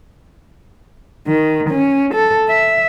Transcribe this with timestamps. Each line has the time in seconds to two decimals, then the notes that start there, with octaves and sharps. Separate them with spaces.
1.27 D#3
1.70 C#4
2.14 A4
2.49 E5